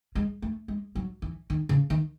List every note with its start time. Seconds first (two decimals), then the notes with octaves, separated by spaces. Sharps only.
0.15 G#3
0.42 A3
0.68 G#3
0.95 F#3
1.22 E3
1.50 D#3
1.69 C#3
1.90 D#3